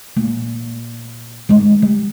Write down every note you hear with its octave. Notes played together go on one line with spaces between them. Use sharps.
A#2
G#2 D#3
G3